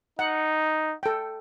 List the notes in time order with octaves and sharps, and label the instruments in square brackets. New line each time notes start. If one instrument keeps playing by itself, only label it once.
[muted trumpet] D#4 [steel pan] F#5
[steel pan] A4 G5